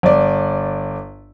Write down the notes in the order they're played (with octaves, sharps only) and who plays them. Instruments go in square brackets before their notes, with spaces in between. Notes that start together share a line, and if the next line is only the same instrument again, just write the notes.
[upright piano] G1 D5